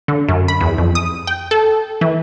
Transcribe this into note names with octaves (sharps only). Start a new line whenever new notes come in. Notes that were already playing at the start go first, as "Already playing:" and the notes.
D3
F#2
B5
E2
F2
D#6
G5
A4
E3